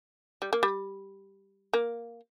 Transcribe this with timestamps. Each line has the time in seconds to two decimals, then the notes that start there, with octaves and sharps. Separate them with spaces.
0.42 G3
0.53 A#3
0.63 G3
1.73 A#3